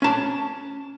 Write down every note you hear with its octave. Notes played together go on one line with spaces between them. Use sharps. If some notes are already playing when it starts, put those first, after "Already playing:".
C#4 A5